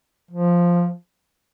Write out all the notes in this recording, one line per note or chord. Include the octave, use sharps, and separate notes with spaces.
F3